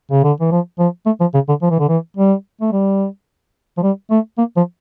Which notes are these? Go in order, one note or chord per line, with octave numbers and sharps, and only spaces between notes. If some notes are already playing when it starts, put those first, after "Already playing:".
C#3
D3
E3
F3
F3
A3
F3
C#3
D3
F3
E3
D3
E3
G3
A3
G3
F3
G3
A3
A#3
F3